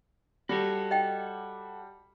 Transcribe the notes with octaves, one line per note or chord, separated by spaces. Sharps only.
G3 F#4 A4 C#5
D#5 G5